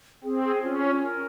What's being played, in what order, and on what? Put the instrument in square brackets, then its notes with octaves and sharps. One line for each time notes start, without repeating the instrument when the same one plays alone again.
[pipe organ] C4 [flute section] G#4
[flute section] G#4
[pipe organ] C#4 [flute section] F4
[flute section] F4
A#4